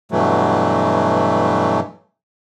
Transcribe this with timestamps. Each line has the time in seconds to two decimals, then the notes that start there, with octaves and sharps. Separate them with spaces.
0.12 G2 B2 E3 F#3 A3